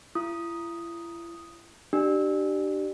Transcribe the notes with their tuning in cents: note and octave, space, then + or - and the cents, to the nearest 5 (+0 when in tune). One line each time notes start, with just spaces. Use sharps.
E4 +45 D#6 +0
D4 +25 G4 -25